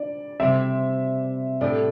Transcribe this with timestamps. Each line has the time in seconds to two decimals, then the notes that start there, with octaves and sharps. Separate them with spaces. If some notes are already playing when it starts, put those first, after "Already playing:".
Already playing: D4 D5
0.40 C3 G3 C4 E5
1.61 A2 A3 D4 G4 D5